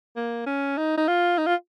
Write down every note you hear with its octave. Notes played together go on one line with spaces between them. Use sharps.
A#3
C#4
D#4
D#4
F4
D#4
F4